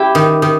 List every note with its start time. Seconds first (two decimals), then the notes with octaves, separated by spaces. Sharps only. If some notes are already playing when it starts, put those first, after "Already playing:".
Already playing: E4 G4
0.15 D#3
0.42 D#3